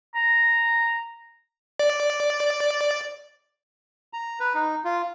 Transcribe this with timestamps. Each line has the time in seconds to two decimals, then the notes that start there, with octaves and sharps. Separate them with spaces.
0.15 A#5
1.79 D5
4.13 A#5
4.40 B4
4.54 D#4
4.85 F4